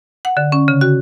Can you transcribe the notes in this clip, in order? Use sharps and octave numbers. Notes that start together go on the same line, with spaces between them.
F#5
D3
C#4
C#3
F#4